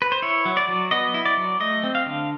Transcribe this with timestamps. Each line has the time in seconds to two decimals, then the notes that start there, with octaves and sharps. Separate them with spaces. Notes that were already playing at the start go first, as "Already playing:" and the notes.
0.02 B4
0.12 C5
0.22 E4 C#5
0.45 F#3
0.57 D5
0.69 F#3
0.91 B3 D#5
1.14 E4
1.26 D5
1.37 F#3
1.60 A3 D#5
1.84 C4
1.95 F5
2.06 D3